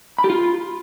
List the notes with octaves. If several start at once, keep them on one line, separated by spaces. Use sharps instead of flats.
B5
G4
F4